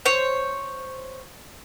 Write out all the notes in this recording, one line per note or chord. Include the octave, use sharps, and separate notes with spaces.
C5 C#5